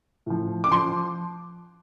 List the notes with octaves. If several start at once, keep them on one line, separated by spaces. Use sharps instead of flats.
A2 F3
D6
F3 C6